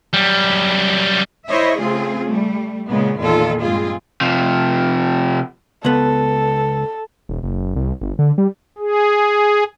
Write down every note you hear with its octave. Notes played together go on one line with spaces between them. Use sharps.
F#2 G3
E4 C5 C#5 D#5 E5
C#3 A3 C4 F4 G#4
G3 A3
A#2 C#3 G#3 B3
E2 A#2 D#3 F4 A4
G2 G#3 C4 F4 G#4
C3 F3
C#2 B3 A4
E1
F#1
C2
G1
D3
G3
G#4